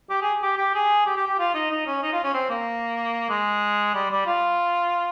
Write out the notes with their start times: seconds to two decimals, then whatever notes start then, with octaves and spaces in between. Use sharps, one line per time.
0.10 G4
0.21 G#4
0.42 G4
0.58 G4
0.75 G#4
1.06 G4
1.16 G4
1.27 G4
1.39 F4
1.54 D#4
1.71 D#4
1.86 C#4
2.02 D#4
2.13 F4
2.24 C#4
2.34 C4
2.50 A#3
3.29 G#3
3.94 G3
4.11 G3
4.27 F4